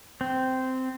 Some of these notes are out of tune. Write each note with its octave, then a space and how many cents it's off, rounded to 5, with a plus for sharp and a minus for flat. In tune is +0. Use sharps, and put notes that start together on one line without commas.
C4 -10